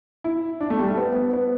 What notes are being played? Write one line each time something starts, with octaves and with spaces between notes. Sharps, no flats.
E4
D4
A3
G3
A3
B3
B3
B3